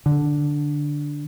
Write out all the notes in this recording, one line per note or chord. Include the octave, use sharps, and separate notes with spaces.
D3